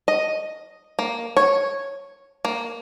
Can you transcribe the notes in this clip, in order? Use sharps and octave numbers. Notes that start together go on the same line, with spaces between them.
D#5
A#3
C#5
A#3